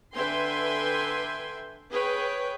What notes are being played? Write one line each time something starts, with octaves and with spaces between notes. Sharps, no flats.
D3 B4 E5 G5 G#5 C6
G#4 B4 C#5 G5